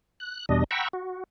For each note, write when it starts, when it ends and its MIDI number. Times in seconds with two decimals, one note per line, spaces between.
0.20 0.46 90
0.49 0.64 40
0.49 0.64 47
0.49 0.64 55
0.49 0.64 62
0.49 0.64 75
0.71 0.88 78
0.71 0.88 79
0.71 0.88 82
0.71 0.88 83
0.71 0.88 85
0.71 0.88 88
0.93 1.24 66